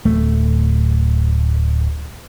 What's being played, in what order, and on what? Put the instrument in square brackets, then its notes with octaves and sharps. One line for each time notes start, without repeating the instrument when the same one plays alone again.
[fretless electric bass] D1 A3